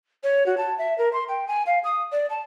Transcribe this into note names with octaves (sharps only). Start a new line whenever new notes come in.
C#5
F#4
A5
E5
A#4
C6
G5
G#5
F5
D#6
D5
A5